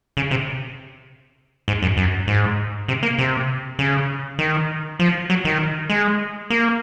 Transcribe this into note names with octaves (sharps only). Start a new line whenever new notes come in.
C#3
C3
G#2
F#2
F#2
G#2
C3
A#3
C3
C#3
D#3
F3
F#3
D#3
G#3
A#3